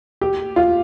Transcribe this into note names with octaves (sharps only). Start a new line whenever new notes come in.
G4
F4